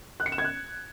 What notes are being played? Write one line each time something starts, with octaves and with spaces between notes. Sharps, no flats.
F#6
C#7
E7
G#6
F#6